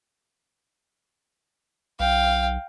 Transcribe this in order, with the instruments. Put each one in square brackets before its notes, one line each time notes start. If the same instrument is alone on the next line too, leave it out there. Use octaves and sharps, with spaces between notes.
[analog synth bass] B1 [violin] F5 G5